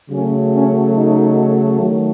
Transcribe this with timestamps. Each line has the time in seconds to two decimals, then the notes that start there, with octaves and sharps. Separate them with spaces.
0.10 C#3 F#3 A3 C#4
0.53 C#4
0.95 D#4
1.80 D#3 F#3 A3